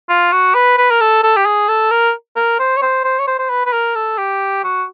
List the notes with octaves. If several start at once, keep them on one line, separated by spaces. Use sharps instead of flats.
F4
F#4
B4
B4
A#4
A4
A4
G4
G#4
A4
A#4
A#4
C5
C#5
C5
C5
C#5
C5
C5
B4
B4
A#4
A4
G4
F#4